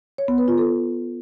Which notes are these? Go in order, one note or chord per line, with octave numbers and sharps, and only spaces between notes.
C#5
B3
B4
F4
A4